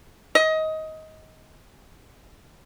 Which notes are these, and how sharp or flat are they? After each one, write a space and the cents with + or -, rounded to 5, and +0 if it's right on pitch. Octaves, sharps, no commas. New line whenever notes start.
D#5 +20